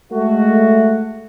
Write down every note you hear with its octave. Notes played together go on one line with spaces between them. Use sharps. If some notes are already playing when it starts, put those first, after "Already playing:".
G#3 A3 F#4